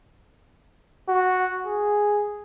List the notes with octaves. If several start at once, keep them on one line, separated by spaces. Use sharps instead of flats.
F#4
G#4